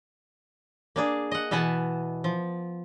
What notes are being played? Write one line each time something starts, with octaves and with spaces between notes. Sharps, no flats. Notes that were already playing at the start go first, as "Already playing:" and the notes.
A#3 D4 G#4
D#5 F#5
B2 E3 B3 F#5 G#5 A5
F3